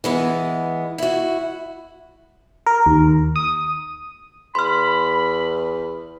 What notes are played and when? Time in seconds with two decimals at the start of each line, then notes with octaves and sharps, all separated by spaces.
0.04 E3 G#3 B3
0.98 E4 F#4
2.67 A#4
2.86 D#2
3.36 D#6
4.55 E2 B5 C6 F6